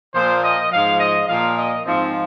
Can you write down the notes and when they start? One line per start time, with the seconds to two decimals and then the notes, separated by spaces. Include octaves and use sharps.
0.14 A#2 F3 C5
0.44 D#5
0.71 G#2 F3 F5
1.00 D#5
1.28 A#2 F3 F5
1.58 D#5
1.86 G#2 F3 C4